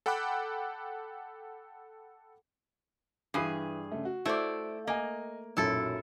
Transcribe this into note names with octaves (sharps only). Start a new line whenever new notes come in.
A4 F#5 G5 B5 D6 F#6
G2 E3 G#4 B5 C7
C#3 A3
F#4
A3 E4 C5 D5
A#3 D#5 G#5
B1 F#2 A#2 E4 A4